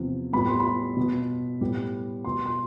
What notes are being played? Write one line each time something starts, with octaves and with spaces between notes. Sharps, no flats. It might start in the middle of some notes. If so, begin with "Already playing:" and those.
Already playing: E2 C3 F3 B3
A2 G3 B3 B5
C6
B5
B2 B3
A2 G3 B3
B2 B3 C6
C6